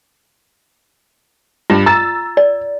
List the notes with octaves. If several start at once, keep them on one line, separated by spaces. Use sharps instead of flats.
G2 F4
A#5 E6 A6
D5